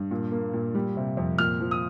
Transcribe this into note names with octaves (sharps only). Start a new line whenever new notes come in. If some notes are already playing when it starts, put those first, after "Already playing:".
Already playing: G2
A#2
A#3
A#2
G3
C3
F2
A#2 F6
F3
D#6